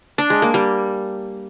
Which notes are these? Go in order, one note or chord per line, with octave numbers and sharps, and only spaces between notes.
D4
G#3
A#3
G3